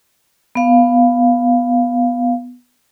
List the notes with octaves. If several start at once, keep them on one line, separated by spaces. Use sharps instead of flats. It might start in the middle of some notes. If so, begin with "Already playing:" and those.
B3 F5